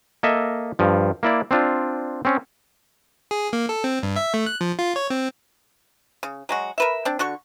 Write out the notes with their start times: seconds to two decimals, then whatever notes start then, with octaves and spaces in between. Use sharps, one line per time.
0.23 A#3 A4 D#5 E5
0.79 G2 F3
1.23 A#3 E4 D5
1.51 C4 D4 F4
2.25 C4 C#4
3.31 G#4
3.53 A#3
3.69 A4
3.84 C4
4.03 G2
4.16 E5
4.34 A3
4.46 F#6
4.61 F3
4.79 F4
4.96 C#5
5.10 C4
6.23 C#3
6.49 F#3 G#3 F#4
6.78 A#4 B4 E5
7.05 C4 D4
7.19 D3 F#4 C#6